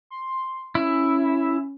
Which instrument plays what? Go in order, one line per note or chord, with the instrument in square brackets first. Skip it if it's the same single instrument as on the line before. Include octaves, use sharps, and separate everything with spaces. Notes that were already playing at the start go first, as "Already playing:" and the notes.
[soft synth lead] C6
[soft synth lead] C#4 [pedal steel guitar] E4